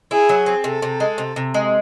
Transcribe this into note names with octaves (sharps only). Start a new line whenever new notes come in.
E4 G#4
F#3
C4
C3 A4
C3
G#3
C3
C3
G#3